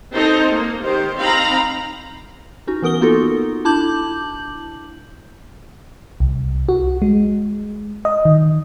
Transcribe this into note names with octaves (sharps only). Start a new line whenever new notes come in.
C4 D#4 A4 C5
A#3
D#3 G4 C5
C4 D#4 F5 A#5 B5
C#4 D#4 F#4
E3 B3 A#4 D#6 G7
A#3 B3 D#4 F4 F#4 A4
D4 E4 A5 D6 G6 F#7
C2
F#4
G#3
D#5
D#3